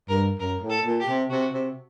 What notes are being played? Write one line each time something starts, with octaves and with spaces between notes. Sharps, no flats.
G2 A#4
F#2 A#4
A2
A4
A#2
G4
C3
C3 F#4
C3